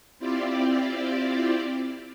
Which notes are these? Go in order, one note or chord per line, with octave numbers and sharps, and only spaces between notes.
C4 E4 F4 G4 D5